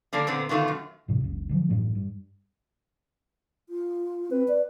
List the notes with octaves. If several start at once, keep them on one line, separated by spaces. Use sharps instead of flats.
D3 A#3 D4 A4
A#2 D3 B3 C4
B2 D3 D#3 A3 F4
F#2
F#2 A2 C3 E3
F#1 C#2
D3 F3 F#3
F#2 A2 E3 A3
G2
F4
C4 B4
D5